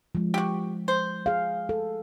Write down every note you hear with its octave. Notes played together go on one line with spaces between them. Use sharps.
F3 G#3
F#4 G4
C5
G#4 F5
A4